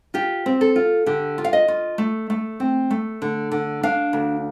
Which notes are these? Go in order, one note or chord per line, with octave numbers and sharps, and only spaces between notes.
F4 G4
C4
A4
F4
D3 G4
F4
F5
D#5
F4
A3
A3
C4
A3
D3
D3
D4 F5
D2